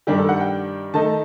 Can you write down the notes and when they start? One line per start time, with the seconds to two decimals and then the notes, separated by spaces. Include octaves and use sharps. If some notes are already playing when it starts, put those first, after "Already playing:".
0.07 G2 D#3 G3 D4 G4
0.18 A4
0.29 F#5
0.40 G5
0.94 D#3 A3 D#4 A5